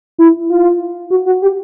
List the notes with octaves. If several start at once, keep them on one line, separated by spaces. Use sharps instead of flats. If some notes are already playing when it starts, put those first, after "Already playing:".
E4
F4
F#4
F#4
G4